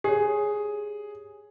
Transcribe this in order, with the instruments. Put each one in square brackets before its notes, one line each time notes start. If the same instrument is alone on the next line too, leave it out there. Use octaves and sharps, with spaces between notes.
[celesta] G4 C#5 [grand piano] G#4